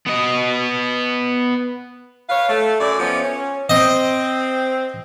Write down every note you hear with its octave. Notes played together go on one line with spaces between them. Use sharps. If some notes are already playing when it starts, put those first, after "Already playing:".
B3 D#5
B4 C#5 F5
A3
F#2 A4 D5
F3 A3 B3 C#4
C#4
C4 D#5